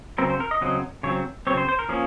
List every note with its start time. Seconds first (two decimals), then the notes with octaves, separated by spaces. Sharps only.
0.18 C#3 F#3 C4 A#4
0.30 C5
0.40 A#4
0.51 D#5
0.61 C#3 F#3 C4 D#5
1.03 C#3 F#3 C4 C#5
1.47 C#3 F#3 C4 C#5
1.57 C5
1.69 C5
1.79 A#4
1.89 F3 A#3 C#4 G#4